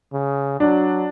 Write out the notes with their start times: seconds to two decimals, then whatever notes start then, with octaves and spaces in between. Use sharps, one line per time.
0.13 C#3
0.60 F#3 D4